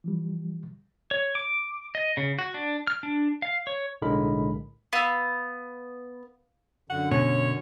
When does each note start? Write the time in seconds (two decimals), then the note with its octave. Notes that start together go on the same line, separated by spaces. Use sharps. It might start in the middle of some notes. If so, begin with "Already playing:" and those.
0.04 E3 F3 G3
1.11 C#5
1.35 D6
1.95 D#5
2.17 C#3
2.39 F#4
2.54 D4
2.87 F6
3.03 D4
3.42 F5
3.67 C#5
4.02 B1 A2 D3 G#3 A#4 B5
4.93 B3 F5 E6
6.90 F#2 D3 F#5
7.11 B2 C#4 C#5